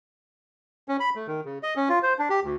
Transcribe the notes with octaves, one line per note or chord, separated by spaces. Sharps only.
C#4
B5
A3
D#3
C#3
D#5
C#4
F4
C5
D4
G4
D2